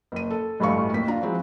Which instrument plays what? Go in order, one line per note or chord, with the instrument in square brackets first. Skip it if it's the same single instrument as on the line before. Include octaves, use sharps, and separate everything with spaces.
[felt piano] F#1 D#7
A4
A1 D2 G2 A3 F5 C#6
F#1 D#2 B6
D4 F4 A#5
F3 G#3 C4 E4 F#4